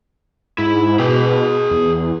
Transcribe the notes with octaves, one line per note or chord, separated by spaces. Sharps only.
G#2 E4
B2 G#4 G5
E2